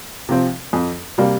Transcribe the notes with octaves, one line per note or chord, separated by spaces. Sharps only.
C3 F3 C4
F2
C3 G3 A#3